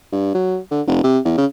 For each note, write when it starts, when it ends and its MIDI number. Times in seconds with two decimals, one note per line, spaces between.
0.12 0.34 43
0.34 0.58 54
0.71 0.82 50
0.87 0.99 29
1.03 1.19 48
1.25 1.38 40
1.38 1.46 49